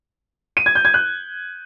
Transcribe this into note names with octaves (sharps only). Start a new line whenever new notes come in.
D#7
G#6
G6
G#6
F#6